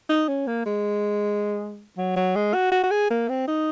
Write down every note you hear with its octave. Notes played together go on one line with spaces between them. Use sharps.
D#4
C#4
A#3
G#3
F#3
F#3
G#3
F#4
F#4
F#4
G#4
A#3
C4
D#4